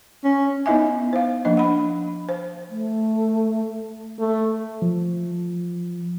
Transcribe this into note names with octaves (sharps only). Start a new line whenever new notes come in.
C#4
B3 D#4 E4 D#5 E5 G#5
C5 F5
F3 A#3 D4 D#5
F#5 B5
C5
A3
A3
F3